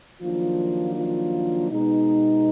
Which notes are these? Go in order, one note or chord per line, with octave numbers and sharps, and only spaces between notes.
D#3 F3 F#3 A#3 D4 F4
F3 F4
B2 G#3 B3 D#4